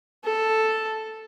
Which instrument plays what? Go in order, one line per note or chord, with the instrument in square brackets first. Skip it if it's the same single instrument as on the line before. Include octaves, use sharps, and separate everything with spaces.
[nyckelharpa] A4